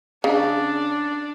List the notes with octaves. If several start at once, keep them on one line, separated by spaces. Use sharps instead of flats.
C#3 D4